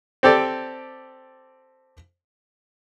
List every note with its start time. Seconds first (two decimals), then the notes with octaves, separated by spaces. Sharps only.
0.23 C4 G4 A4 D5